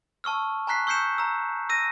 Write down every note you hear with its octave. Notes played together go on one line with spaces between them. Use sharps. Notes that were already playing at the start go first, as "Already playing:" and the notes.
A5 C#6 E6 F6
G#5 A#5 C#6 F#6 B6 C7
C#6 E6 G6 C7 C#7 E7
A#5 E6
E6 A#6 D#7